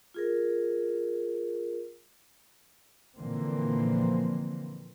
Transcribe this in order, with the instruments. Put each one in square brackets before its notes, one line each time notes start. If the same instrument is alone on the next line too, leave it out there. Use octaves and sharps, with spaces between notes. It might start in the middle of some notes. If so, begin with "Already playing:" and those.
[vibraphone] F4 G#4 A#4
[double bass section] A#2 D3 E3 F3 A#3 C4